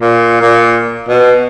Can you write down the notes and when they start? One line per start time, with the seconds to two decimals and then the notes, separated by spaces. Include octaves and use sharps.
0.01 A#2
0.42 A#2
1.08 B2